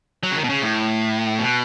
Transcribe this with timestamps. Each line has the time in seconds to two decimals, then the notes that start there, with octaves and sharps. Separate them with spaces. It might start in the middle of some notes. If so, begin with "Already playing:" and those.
0.23 F#3
0.31 C#3
0.36 D#3
0.44 B2
0.49 C#3
0.62 A2
1.39 B2